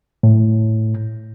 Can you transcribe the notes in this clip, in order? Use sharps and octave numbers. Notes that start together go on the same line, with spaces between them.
A2